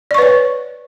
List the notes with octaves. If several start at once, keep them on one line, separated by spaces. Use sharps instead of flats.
B4 C#5 D5 C#6